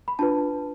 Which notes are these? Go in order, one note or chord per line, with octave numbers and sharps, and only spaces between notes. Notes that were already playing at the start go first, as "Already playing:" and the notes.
B5
D4 F4 B4 A5